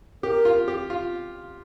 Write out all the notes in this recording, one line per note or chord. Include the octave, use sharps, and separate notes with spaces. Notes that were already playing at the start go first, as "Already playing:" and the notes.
G4 A#4
F4
G4
F4